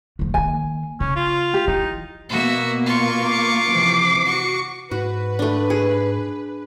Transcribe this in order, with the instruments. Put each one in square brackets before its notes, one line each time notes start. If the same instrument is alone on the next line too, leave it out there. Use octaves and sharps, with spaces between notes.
[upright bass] D2 F3
[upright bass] D#3 A#3 [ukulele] G#5
[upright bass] C#3 [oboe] C#4
[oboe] F4
[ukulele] G4
[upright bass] E3 [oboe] D#4
[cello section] B2 A#3 B3 [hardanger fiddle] F#4 E5
[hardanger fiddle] F4 C#6
[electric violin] D6 C7
[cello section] C3 E3 F3
[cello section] F#4 [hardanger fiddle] C#6
[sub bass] G#2 [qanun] F#4 [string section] B4
[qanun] A3 D4
G#4